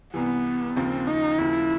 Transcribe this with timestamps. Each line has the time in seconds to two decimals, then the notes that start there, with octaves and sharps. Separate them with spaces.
0.14 C2 C3 E3 B3
0.76 D#2 C#3 F3 C4
1.07 D#4
1.39 D#2 C#3 F3 E4